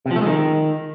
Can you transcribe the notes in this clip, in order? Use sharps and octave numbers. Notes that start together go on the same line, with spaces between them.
C3
F3
A3
G#3
D#3